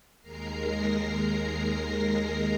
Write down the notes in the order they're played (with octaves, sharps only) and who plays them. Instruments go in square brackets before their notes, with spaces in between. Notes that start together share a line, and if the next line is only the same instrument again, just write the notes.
[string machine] D#2 G#3 A#4 A#5 C7